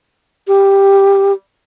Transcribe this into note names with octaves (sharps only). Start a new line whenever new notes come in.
G4